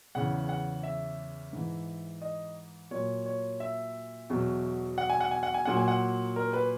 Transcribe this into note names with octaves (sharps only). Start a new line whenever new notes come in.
E2 C#3 E3 F#5
F#5
E5
G#2 E3
D#5
A#2 F#3 C#5
C#5
E5
E2 B2 F#3
F#5
G#5
F#5
G#5
F#5
G#5
A#2 F#3 F#5
G#5
F#5
A#4
B4